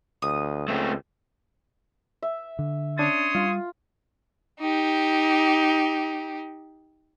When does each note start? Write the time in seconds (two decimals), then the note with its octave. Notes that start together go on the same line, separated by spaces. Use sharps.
0.22 D2 D#6
0.68 C#2 A3 C4
2.22 E5
2.59 D3
2.98 C#4 D4 C#5 C6 D#6 A6
3.35 G3 F4
4.60 D#4 G4